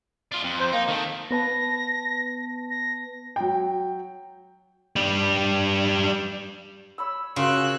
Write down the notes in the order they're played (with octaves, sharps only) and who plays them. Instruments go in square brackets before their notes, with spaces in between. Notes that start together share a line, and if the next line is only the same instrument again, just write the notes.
[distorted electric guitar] D4 F4
F2
[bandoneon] C5
[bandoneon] A#3 [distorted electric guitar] D#4
[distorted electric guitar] D#3 A3
[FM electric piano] B3 B4 A5 [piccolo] A#6
[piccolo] A#6
[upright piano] F#3 G5
[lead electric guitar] G3 D4
[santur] C#5 B5 E6
[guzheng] C#3 [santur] F4 A#4 C#5 [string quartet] F#4 E6 F#6